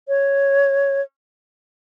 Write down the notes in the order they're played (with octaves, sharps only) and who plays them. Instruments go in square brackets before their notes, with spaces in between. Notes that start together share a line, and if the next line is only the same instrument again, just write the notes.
[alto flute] C#5